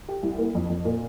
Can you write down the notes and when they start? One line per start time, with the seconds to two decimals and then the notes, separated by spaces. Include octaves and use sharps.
0.08 G4
0.23 C2
0.38 A#3
0.55 F2
0.70 F2
0.85 A#2